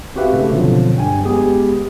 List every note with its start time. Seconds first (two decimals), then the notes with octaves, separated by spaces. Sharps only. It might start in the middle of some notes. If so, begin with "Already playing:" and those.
0.15 C4 F#4 G4 B4 E5 F5
0.32 G#2 C#3 A3
0.51 B2 D3 F3 F#3 C4
0.96 G2 G5 G#5
1.25 G#3 B3 G4 G#4